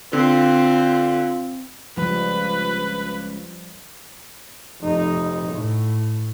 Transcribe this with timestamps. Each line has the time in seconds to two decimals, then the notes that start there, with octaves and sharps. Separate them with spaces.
0.13 D3 C4 F4
1.97 C#2 F3 G3 B4
4.83 F1 D#4
5.53 A2